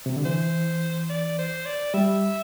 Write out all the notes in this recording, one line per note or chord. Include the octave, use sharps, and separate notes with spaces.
C3
D3
E3 C5
D5
C5
D5
G3 E5